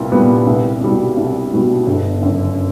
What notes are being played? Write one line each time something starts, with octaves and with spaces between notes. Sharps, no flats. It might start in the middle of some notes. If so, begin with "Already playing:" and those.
Already playing: C2 A#2 G3 B3
A#2 G3 B3
C2
B2 G3
C2
B2 G3
G1
F#2 C#3